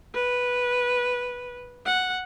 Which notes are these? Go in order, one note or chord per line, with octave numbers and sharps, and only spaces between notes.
B4
F#5